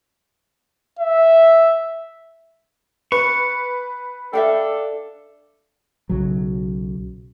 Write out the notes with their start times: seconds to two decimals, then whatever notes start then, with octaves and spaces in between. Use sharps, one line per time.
0.99 E5
3.12 B4 C#6
4.33 D4 A4 E5 F5 G5
6.09 B1 C#3 F#3